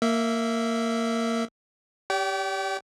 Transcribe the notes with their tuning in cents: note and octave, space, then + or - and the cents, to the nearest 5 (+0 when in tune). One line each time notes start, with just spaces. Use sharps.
A#3 -15 E5 +0
G4 +0 D5 -45 G5 -35